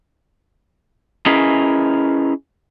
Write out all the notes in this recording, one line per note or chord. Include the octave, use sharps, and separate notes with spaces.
C#4 E4 G#4 A#4 B4 D#5